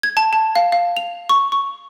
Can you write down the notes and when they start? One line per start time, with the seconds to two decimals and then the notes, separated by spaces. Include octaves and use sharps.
0.03 G#6
0.17 A5
0.33 A5
0.56 F5
0.72 F5
0.97 F7
1.29 C#6
1.52 C#6